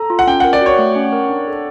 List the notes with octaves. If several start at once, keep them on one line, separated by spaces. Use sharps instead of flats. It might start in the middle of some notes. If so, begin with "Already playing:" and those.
Already playing: A4 A#5
F4
F#5
C#4 G5
A#4 F#5
D5
F#4 C#5
A3
C#4
A#4
D4
A4